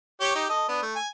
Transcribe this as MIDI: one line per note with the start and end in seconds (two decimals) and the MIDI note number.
0.21 0.34 67
0.21 0.34 73
0.35 0.44 63
0.35 0.44 67
0.49 0.63 69
0.49 0.63 75
0.68 0.81 59
0.68 0.81 62
0.82 0.95 57
0.96 1.08 80